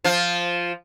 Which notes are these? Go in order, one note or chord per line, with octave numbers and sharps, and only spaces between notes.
F3 F4